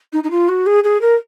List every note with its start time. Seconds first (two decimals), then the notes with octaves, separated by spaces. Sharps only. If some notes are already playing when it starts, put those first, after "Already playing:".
0.13 D#4
0.23 D#4
0.30 F4
0.48 F#4
0.66 G#4
0.84 G#4
1.01 A#4